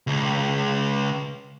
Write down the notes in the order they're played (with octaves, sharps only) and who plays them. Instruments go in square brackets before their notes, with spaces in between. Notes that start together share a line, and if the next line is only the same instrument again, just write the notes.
[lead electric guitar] C#2